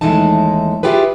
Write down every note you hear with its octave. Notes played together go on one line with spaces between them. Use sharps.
D#2 E3 G#3 A3 D#4 A5
E4 F4 G4 G#4 B4